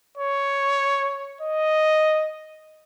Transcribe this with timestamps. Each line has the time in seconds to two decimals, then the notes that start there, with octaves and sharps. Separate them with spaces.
0.18 C#5
1.41 D#5